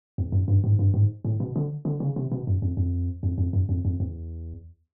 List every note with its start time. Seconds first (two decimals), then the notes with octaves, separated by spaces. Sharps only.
0.18 E2
0.32 F#2
0.48 G2
0.64 G#2
0.79 G2
0.94 G#2
1.25 A2
1.40 B2
1.56 D3
1.85 D3
2.00 C#3
2.16 C3
2.32 B2
2.47 F#2
2.62 F2
2.77 F2
3.23 F2
3.38 F2
3.53 F#2
3.69 F2
3.85 F2
4.00 E2